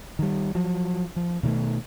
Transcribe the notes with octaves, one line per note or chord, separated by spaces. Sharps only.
D#3 G3
F3 F#3
F3
B2 D#3 G3 A3